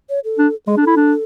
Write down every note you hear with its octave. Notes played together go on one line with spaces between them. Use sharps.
C#5
A4
D4
G#3 G#4
D4
E4 A4
D4